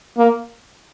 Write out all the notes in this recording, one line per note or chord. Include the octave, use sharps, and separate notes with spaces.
A#3